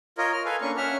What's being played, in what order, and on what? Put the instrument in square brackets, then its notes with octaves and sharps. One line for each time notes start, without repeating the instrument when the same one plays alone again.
[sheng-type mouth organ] F4 A#4 C#5 D#5
F6
A4 B4 F5 G#5
A#3 C#4 D4 C#6
C#4 E5 F#5 F6